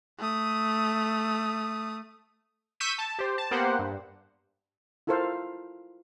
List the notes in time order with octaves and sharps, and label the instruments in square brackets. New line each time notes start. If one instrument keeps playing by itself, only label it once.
[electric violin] A3 D#6
[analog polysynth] C#6 E6 G6 B6 D#7
A5
G4 C5
A5
A#3 B3 G4 C5 F#5
G2
[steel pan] E4 F4 A4 A#4 C5 F5